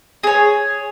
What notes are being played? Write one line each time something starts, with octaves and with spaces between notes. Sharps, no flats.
G#4 C#5